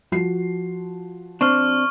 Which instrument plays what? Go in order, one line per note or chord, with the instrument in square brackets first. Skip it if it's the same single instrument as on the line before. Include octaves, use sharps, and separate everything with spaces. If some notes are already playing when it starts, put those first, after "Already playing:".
[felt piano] F3 F#4 C7
[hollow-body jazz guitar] C4 D4 [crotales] C#6 F6